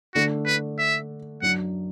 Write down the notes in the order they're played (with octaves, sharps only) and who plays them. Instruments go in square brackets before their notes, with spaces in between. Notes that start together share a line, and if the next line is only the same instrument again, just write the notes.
[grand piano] D3 A3 D4 A4 [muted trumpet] F#4
[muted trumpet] B4
E5
[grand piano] F#2 F#3 D4 [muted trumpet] F#5